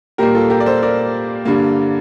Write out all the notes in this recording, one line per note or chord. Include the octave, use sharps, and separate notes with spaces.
A#2 G3 A#3 G4 A#4
F4 A4
G4 A#4
D5
A4 C5
A#4 D5
G2 D3 G3 A#3